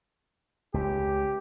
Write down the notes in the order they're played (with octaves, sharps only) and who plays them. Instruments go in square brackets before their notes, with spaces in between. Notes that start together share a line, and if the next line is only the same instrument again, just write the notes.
[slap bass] C#2 [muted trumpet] G4